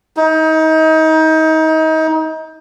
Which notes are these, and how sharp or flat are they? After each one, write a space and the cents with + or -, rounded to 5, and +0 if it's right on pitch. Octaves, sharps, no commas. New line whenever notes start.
D#4 +30